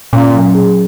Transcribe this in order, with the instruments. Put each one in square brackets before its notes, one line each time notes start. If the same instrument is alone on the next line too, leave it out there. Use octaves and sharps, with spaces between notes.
[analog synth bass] A#2 [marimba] C#4
[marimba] F#3
G#4